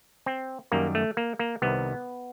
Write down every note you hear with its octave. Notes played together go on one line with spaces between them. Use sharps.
C4
F#2 D#3 G3 A#3
A3
A#3
A#3
C2 C3 D#3 B3